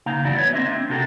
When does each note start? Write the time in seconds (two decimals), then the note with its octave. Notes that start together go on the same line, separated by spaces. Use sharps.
0.06 C#3 A#3 D#4 F5 A#5
0.23 E2 G2 E4 F#4 D5
0.37 B3 C#5
0.53 A#3 C4 D4 D#5 E5
0.72 C4 D4
0.90 C3 D4 F#4 G4 A4 A#4